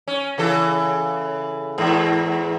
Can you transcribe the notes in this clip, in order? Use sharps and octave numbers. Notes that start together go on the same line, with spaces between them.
C#4
C#3 E3 A4
E2 G#2